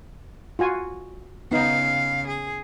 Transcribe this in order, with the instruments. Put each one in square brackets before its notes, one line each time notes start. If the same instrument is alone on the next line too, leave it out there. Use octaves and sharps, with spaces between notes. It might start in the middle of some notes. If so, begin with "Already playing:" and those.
[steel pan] F4 F#4 G#5
[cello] C#3 F5 [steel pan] B3 D#4
[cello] G#4